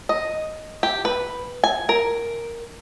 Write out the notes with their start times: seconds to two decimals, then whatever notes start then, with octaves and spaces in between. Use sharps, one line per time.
0.09 D#5
0.83 G4
1.05 B4
1.64 G#5
1.89 A#4